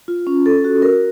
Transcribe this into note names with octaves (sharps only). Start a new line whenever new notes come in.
F4
C#4
A4
F#4
A#4